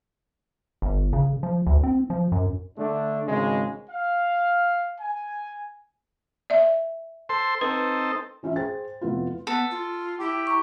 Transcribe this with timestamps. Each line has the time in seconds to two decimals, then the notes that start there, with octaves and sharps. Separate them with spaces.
0.82 G1
1.13 C#3
1.43 F3
1.67 D2
1.83 C4
2.10 F3
2.32 F#2
2.78 D3 A3 D4
3.26 G#1 C#3 G#3
3.90 F5
4.99 G#5
6.50 D5 E5
7.29 A4 C5 C6
7.61 C4 D#4 A4 B4
8.43 E3 C#4 F4 F#4 E5
8.56 G#4 C5 G5 A6
9.01 F1 B3 E4 F4
9.47 B3 A4
9.71 F4
10.20 E4 G4
10.47 A#5 C#6